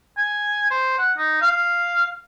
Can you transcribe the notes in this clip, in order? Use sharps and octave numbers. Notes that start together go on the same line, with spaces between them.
G#5
C5
F#5
D#4
F5